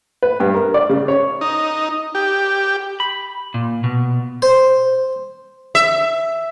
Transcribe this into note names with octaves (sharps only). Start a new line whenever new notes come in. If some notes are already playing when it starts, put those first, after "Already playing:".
B4
G2
A#4
D5
C#3
C#5
D#4
G4
B5
A#2
B2
C5
E5